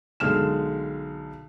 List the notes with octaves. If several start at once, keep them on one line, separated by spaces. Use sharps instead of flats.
B1 D3 G#3 F6 E7